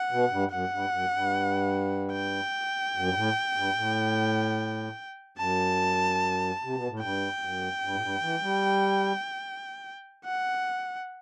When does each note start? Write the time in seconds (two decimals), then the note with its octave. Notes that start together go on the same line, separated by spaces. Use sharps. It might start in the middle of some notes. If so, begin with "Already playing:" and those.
Already playing: F#5
0.11 B2
0.30 G2
0.51 F#2 F#5
0.71 G2
0.91 F#2
1.12 G2
2.13 G5
2.95 F#2
3.07 G2
3.15 A2
3.56 G2
3.75 A2
5.38 F#2 A5
6.63 C3
6.75 B2
6.88 A2
7.00 G2 G5
7.40 F#2
7.82 G2
7.95 A2
8.01 G2
8.22 E3
8.42 G3
10.25 F#5